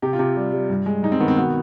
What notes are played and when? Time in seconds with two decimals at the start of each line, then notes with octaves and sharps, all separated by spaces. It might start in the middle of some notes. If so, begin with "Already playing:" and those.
0.02 C3 G4
0.13 F4
0.19 C3
0.36 G3
0.52 G3
0.70 G2
0.86 G#3
1.03 G2 D#4
1.12 C4
1.20 D#3 B3
1.28 C4
1.37 B2 B3